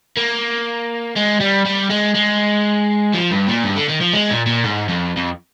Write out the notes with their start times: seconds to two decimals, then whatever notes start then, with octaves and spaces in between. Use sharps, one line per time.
0.17 A#3
1.16 G#3
1.40 G3
1.66 G3
1.90 G#3
2.15 G#3
3.14 F3
3.31 G2
3.48 A#2
3.64 G2
3.77 D3
3.89 D#3
4.01 F3
4.14 G#3
4.31 A#2
4.46 A#2
4.64 G#2
4.88 F2
5.17 F2